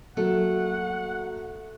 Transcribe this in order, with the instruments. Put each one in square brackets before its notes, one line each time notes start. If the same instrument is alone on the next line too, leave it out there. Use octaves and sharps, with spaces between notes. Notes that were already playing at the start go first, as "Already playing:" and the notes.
[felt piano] F#3 A#3 A4 [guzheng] A3 [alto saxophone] F#5